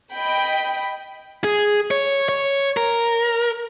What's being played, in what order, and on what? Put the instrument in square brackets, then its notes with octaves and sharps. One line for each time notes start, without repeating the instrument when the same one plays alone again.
[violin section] D#5 G5 B5
[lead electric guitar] G#4
C#5
C#5
A#4